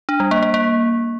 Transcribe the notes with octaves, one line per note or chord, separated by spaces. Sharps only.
D4
G3
A#3
A#3
A#3